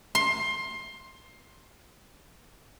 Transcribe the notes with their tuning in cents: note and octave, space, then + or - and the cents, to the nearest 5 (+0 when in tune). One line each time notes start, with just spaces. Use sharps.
C6 +20